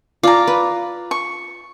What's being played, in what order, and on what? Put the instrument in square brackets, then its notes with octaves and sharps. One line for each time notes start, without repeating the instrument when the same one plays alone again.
[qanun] F4 [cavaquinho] D5 A#5
[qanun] B4
[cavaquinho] C#6